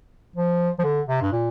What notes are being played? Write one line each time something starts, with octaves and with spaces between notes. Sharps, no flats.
F3
F3
D3
C3
G2
A#2